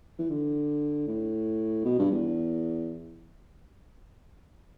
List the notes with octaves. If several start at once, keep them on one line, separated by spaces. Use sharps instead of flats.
E3
D3
A2
B2
G2
E2